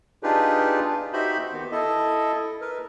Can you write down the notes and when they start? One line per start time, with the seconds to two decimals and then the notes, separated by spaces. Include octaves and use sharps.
0.23 D4 D#4 F4 G4 G#4 B4
1.13 D#4 F#4 G4 C5 E5 B5
1.53 D#3 B3
1.72 E4 A4 D#5
2.61 A#4 B4